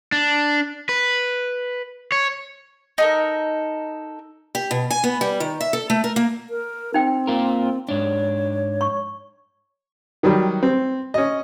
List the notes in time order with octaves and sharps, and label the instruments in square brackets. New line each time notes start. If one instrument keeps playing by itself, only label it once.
[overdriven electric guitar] D4
B4
C#5
[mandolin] D#4 A4 A#4
[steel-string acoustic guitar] G4
B2
G#5
B3
G3
D#3
E5
A4
A3
A#4
A#3
[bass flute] A#4
[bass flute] C4 [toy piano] D#4 G5
[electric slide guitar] A#3 F4 A#4
[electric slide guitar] G#2 D4 [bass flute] C#5
[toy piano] C#6
[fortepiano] D#3 F#3 G3
C4
C#4 D#5